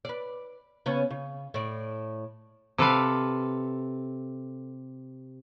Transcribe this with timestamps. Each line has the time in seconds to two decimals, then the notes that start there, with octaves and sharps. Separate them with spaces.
0.05 B4 D5
0.86 C#3 B3 C#4
1.11 C#3
1.54 A2 D5
2.78 C3 A4 B4 F5